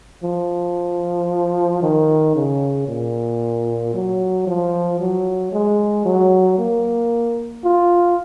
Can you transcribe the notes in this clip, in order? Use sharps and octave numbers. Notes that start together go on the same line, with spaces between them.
F3
D#3
C#3
A#2
F#3
F3
F#3
G#3
F#3
A#3
F4